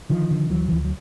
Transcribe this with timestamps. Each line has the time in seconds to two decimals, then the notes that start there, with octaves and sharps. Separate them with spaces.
0.10 D3 D#3 F3
0.31 D3
0.50 D2 E3 F#3
0.68 E3
0.71 D2 F3
0.84 F#3